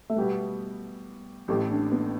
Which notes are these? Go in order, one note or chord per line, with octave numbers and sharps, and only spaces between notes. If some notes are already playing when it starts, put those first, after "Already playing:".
A3
B2 G3 B3 G4 B4
A1 A2 E3 G4
D4
B3